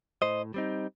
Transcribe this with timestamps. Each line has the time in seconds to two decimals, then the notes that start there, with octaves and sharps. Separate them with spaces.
0.22 A2 C5 D#5
0.54 G3 C4 D#4